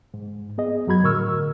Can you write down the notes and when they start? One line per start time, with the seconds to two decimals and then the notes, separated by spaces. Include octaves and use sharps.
0.14 G#2
0.58 B3 G#4 D#5
0.87 F#2 F#3 F#4 B5 G#6
1.02 A2 D3 A#4 C#6 E6 F6